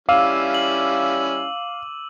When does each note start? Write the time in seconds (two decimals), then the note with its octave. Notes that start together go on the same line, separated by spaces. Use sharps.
0.09 G3 C#4 E4 F5 D6 E6 D#7
0.54 F#7